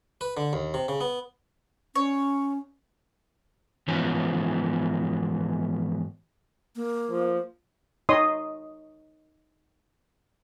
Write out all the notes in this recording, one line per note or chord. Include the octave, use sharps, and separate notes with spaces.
B4
D3
D#2
C3
C#3
B3
C#4 C#5
G#2 E3 F3 B3 C#4
A#3
F3
D#4 C#5 D#5 C6 D#6